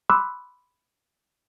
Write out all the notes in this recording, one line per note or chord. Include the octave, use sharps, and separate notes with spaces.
B5 C6 D6 E6 F#6